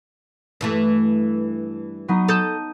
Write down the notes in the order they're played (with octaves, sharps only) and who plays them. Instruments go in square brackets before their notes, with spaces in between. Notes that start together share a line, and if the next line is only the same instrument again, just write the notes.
[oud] G2 E3 A3
[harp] F#3 B3 D#4
[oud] A4 [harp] D#6 G6